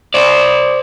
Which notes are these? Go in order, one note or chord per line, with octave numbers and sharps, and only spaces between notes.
C5 D5